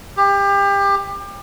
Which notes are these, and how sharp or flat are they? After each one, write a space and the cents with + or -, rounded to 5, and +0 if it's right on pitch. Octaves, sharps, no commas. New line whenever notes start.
G4 +25